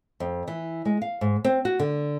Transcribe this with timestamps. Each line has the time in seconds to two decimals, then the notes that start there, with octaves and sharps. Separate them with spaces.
0.20 F2
0.48 E3
0.85 G#3
1.02 F5
1.21 G#2
1.44 C4
1.65 F#4
1.79 D3